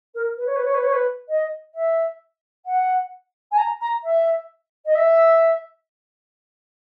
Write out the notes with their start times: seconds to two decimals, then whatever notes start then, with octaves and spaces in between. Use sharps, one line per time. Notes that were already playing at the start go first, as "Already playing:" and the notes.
0.14 A#4
0.37 B4
0.46 C#5
0.56 B4
0.65 C#5
0.74 B4
0.83 C#5
0.92 B4
1.28 D#5
1.74 E5
2.66 F#5
3.51 G#5
3.57 A#5
3.80 A#5
4.03 E5
4.85 D#5
4.95 E5